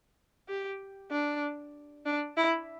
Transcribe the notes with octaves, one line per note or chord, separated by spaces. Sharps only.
G4
D4
D4
E4